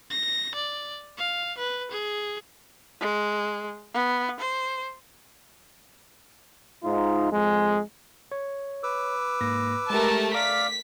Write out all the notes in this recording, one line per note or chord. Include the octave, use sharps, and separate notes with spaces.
A#6
D5
F5
B4
G#4
G#3
B3
C5
G#2 D#4 F4
F2 G#3
C#5
B4 D6 E6
G#2 A#3 A#6
G#3 A3 G4 A#4 A5
D5 F5 D6 B6